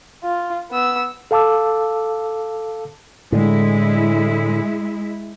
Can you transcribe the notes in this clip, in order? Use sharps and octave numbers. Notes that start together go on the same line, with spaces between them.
F4
B3 E6
A4 F5 A5 D6 E6
A2 D3 G#3 E4